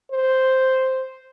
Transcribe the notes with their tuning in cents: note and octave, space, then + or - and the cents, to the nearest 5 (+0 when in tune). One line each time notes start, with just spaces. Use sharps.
C5 +0